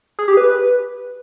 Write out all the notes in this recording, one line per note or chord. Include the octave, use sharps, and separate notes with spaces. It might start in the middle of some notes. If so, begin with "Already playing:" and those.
G#4
G4
B4